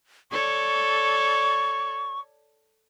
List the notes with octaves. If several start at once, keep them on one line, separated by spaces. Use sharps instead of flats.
A4 C#5 D5 C#6